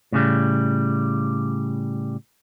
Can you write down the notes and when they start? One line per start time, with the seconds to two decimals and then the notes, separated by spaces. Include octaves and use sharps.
0.12 A2 C#3 G3